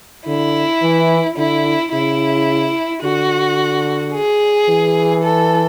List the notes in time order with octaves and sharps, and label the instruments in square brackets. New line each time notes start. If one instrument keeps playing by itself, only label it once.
[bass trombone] D3 [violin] E4
[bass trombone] E3
[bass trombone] D3 [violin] E4
[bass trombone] C#3 [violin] E4
[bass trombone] D3 [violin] F#4
[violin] G#4
[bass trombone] E3
[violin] A4